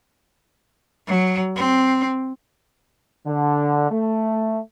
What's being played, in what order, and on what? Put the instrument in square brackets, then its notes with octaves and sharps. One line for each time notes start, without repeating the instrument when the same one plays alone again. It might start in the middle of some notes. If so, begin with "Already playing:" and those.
[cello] F#3
C4
[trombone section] D3
A3